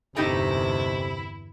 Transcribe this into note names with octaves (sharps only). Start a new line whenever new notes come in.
G1 E2 C3 A3 D#4 E4 G4